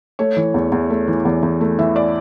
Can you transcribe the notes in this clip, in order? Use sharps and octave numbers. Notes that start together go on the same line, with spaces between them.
A3 C#5
E3
E2
E2
A3
E3
E2
E2
A3
E3 E5
D5